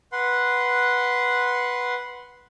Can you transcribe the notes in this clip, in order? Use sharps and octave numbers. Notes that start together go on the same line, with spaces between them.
B4 F#5 C6